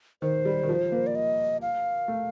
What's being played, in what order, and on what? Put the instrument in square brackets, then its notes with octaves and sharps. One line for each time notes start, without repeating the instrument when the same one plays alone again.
[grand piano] D#3 [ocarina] C5
[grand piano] G3
D#3
F3
A#3
[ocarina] D5
D#5
F5
[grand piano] A3